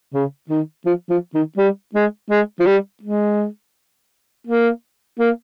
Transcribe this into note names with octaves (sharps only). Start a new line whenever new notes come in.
C#3
D#3
F3
F3
D#3
G3
G#3
G#3
F3
G3
G#3
A#3
A#3